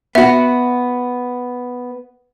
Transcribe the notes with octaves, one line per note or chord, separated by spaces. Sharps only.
B3 F#4 E5